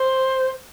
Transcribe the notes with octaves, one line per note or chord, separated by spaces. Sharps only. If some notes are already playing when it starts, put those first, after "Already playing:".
Already playing: C5